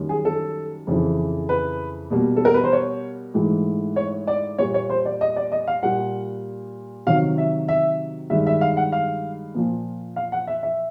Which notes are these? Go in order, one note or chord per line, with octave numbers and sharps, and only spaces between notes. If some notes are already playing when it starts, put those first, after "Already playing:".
Already playing: F#2 D#3 G3 A#3
G#4
A4
F2 C#3 E3
B4
B2 G3 A#3
A4
A#4
B4
C5
C#5
G#2 E3 A3
C#5
D5
A#2 G3 A#3 C#5
C#5
C5
D5
D#5
D5
D#5
F5
A#2 G3 A#3 F#5
C3 D#3 F#3 F5
E5
E5
G2 D#3 G#3 E5
E5
F5
F#5
F5
A#2 F3 A#3
F5
F#5
E5
E5